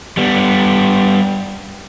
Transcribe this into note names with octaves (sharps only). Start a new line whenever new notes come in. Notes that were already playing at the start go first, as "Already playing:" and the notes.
G3 B3